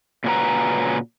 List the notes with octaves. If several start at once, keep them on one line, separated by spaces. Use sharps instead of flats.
A#2 C#3 C#4 F#4 B4 A#5